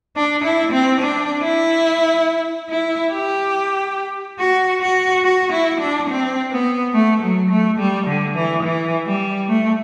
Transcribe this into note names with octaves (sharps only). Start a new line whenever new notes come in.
D4
E4
C4
D4
E4
E4
G4
F#4
F#4
F#4
E4
D4
C4
B3
A3
F#3
A3
G3
D3
E3
E3
G3
A3